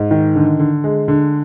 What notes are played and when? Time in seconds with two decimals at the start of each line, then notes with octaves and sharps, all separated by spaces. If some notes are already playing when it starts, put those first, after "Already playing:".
Already playing: G#2
0.11 D#3
0.35 D3
0.59 D3
0.84 G#3
1.08 D3